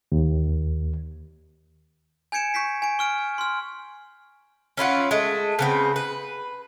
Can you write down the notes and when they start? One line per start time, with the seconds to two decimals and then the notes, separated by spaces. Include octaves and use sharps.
0.12 D#2
2.32 G#5 G6 G#6 C#7 D7 E7
2.54 C#6 G6 B6 C7
2.82 G#5 D7
2.99 C#6 F6 D7
3.38 C6 F6
4.77 C#4 E4 F4 F#5
5.11 G#3 A3
5.59 C#3 B3 C4
5.96 B4